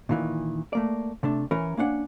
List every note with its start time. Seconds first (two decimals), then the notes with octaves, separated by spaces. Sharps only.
0.09 A#2 D#3 E3
0.73 A3 A#3 D5
1.23 C3 A3 D4
1.51 E3 C#4 A#4
1.77 A#3 C#4 D4 F#5